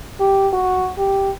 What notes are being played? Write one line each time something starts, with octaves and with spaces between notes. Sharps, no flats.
G4
F#4
G4